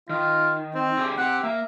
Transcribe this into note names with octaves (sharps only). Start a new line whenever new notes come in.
D#3 F4
C4
D3 G4 G#4
C4 G4 F#5
A#3 E5